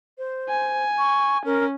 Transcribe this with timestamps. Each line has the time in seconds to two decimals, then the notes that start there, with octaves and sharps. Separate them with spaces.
0.18 C5
0.49 G#5
0.98 C#6
1.45 C#4 A#4